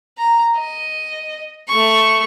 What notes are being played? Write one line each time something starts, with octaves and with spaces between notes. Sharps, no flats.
A#5
D#5
A3 C#6